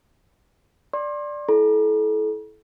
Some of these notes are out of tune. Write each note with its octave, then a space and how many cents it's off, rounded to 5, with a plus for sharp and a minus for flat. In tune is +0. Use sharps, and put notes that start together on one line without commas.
D5 +0 C6 +35
E4 +0 A4 -30 A#5 +45